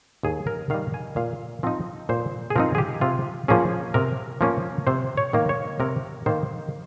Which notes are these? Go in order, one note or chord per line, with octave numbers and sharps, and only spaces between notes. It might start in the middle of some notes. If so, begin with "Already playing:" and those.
D#2 G#4
A#4
D#3 G3 F5
G#5
A#2 F5
F3 C4 D#4
A#2 C5
G#4
F3 C4 D#4 A#4
G#4
G4
C3 F4
F3 A#3 C#4 G#4
C3 A#4
F3 A#3 C#4
C3 C5
C#5
D#3 A#3
C#5
C3 A#4
D#3 A#3 C5